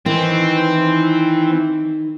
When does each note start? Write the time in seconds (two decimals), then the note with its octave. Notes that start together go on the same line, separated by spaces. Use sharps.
0.06 D#3 E3 C4